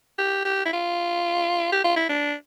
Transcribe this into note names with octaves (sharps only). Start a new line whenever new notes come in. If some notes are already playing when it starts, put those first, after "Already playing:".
G4
G4
E4
F4
G4
F4
E4
D4